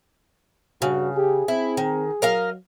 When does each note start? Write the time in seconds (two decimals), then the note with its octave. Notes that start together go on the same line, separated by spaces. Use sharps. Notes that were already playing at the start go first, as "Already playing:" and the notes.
0.82 G2 C#3 F#4
1.16 G4 G#4
1.48 C4 E4
1.77 D#3
2.22 F#3 A#4 D#5 F5